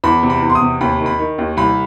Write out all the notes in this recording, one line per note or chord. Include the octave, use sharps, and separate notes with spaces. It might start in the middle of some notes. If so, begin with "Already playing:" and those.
E2 B5
C3
B5
E2
C6
D#6
C3
D#2 B5
D#3
B5
D#3
D#2
C2 B5